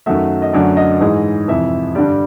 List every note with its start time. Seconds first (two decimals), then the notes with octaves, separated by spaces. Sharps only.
0.06 F#2 D#3 F#3 A3 E5
0.42 D#5
0.53 F#2 D3 F#3 A3 D5
0.77 D#5
1.00 G#2 E3 G#3
1.48 F2 C3 E3 E5
1.95 G2 D3 G3 D5